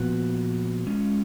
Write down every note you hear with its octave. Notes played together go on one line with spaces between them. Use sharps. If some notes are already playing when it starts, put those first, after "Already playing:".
Already playing: A#2 F3 B3 F#4 B4
G#3 C#4 F4